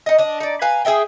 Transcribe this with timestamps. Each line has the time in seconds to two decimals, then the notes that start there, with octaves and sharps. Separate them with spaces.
0.06 D#4 D#5
0.18 D4 D#5
0.40 D#4 D5
0.62 B4 F5 G#5 A#5
0.85 G#4 A4 E5 G5